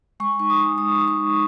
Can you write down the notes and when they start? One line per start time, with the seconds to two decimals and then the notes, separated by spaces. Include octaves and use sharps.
0.20 G#3 C#6
0.40 D#4 C#6
0.50 D#6
0.59 G#3 C#6
0.78 G#3 D#6
0.97 D#4 D#6
1.08 C#6
1.17 G#3